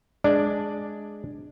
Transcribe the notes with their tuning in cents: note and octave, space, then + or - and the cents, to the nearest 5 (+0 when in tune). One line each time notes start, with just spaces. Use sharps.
G#3 +5 D4 +0 D5 +0